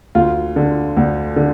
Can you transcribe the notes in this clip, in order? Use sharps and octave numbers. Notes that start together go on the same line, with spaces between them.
D2 F4
D3
D2
D3